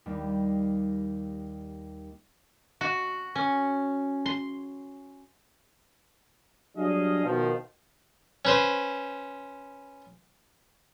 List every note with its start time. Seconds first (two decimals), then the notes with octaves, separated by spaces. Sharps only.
0.06 D#2 G3
2.81 F#4
3.35 C#4
4.26 C6
6.76 F#3 G3 D4 G#4 D#5 F5
7.24 B2 D#3 F3
8.45 C#4 B4 C5